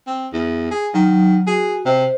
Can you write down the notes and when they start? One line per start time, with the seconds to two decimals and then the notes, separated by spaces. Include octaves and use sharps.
0.07 C4
0.33 E2
0.71 G#4
0.94 D#3 F#3
1.47 F#4 G#4
1.86 C3 C5 D#5